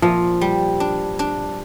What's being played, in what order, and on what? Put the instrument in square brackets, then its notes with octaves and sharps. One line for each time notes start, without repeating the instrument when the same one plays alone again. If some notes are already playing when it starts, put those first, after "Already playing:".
[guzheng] A#2 [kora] F3
[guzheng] G3
D4
D4